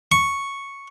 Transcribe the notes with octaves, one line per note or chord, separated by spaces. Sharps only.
C#6